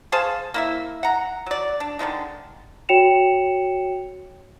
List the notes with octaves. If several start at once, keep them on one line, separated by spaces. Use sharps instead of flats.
G#4 C5 F5 A5
A#3 E4 E5
F#5 A#5
F#3 D5
D4
D3 D#3 F3 G#3
F#4 C#5 G5 C#7 E7 F7